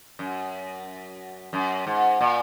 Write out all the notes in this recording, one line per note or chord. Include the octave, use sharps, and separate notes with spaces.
F#2
F#2
G#2
A#2